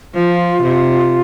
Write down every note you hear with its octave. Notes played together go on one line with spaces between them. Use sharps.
F3 F4
C3